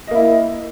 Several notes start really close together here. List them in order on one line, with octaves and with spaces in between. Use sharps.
D#5 A#3 E4